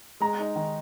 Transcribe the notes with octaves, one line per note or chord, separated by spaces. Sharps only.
G#3 A#5
D#4
D#3